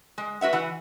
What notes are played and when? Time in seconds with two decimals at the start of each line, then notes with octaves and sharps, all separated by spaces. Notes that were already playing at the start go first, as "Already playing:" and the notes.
0.18 G#3
0.41 F#4 B4 E5 F#5
0.53 E3 F#5